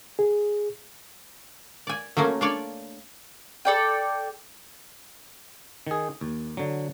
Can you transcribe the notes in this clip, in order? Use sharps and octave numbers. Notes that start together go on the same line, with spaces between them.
G#4
D5 G#5
F#3 A3 A#3 C#4
D4 F4 C#5 D5
A4 D5 G5
D#3 G#4
D#2
D3 F#3